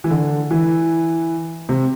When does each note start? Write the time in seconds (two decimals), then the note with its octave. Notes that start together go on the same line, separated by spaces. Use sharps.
0.04 E3
0.11 D3
0.51 E3
1.69 C3